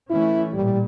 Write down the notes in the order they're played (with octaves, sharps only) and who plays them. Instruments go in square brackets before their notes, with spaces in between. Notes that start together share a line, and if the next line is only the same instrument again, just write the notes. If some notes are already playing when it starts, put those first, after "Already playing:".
[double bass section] E3 A3 C#4 [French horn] E4
[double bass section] A1 A#2 [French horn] G3